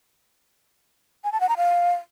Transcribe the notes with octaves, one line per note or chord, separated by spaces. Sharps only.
G#5
A5
F#5
A#5
F5